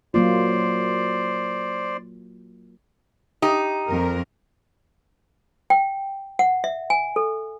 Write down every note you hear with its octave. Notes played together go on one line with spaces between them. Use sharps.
F#3 A#3 F4 C5 D5
D#4 G4
F2 A#4
G5
F#5
E5
G#5
A4